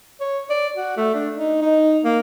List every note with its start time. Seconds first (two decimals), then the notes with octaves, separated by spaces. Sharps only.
0.21 C#5
0.50 D5
0.76 F#4
0.97 A3
1.14 D4
1.34 D#4
1.62 D#4
2.04 A#3